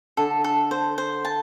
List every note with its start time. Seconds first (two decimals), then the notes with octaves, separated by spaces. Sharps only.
0.17 D3 A4
0.44 A4
0.71 C5
0.98 C5
1.25 A5